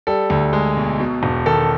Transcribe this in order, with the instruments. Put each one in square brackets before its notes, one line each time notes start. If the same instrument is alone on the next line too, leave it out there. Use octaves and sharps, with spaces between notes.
[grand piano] G3 A4
D2
G#3
B1
B2
E1
D#3 A4